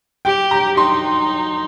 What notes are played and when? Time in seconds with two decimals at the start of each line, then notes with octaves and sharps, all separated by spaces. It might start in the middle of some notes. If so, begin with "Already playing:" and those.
0.25 G4 G5
0.51 A#5
0.77 D#4 C6